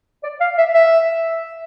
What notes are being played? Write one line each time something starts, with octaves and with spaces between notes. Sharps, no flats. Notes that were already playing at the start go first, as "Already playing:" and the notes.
D5
F5
E5
E5